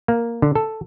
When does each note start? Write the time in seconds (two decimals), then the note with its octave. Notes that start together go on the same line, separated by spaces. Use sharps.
0.08 A#3
0.42 D3
0.55 A4